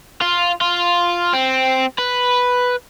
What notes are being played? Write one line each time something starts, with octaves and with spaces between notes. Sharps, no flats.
F4
F4
C4
B4